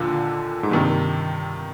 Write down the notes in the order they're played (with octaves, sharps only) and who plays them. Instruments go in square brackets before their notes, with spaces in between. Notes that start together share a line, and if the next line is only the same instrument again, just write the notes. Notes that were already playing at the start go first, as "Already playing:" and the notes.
Already playing: [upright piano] D#2 D3 F3 A#3 F4 [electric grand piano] A#2
[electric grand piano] G#2
[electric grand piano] G2 [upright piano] C3 D#3 G3